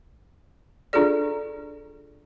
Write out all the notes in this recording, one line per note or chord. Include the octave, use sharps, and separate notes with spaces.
D4 F4 G#4 A4 D5